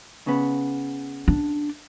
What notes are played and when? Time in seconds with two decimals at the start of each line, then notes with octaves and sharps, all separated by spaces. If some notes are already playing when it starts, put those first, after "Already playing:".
0.27 C#3 B3
1.28 D4